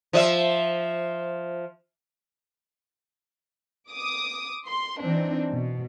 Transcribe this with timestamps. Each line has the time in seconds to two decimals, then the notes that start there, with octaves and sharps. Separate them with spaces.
0.13 F3 D#5 E5
3.90 D6 D#6
4.66 C6
5.02 E3 C4 D4 D#4
5.51 B2